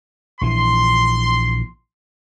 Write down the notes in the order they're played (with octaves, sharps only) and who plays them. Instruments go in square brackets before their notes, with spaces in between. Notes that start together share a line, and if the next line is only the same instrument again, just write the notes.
[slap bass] A#1 E3 [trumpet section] C6